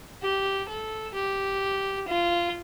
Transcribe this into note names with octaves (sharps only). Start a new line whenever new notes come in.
G4
A4
G4
F4